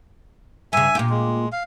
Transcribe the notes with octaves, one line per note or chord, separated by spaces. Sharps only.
G2 C#3 E5 G#5
A#2 F4 G4
G#3
F5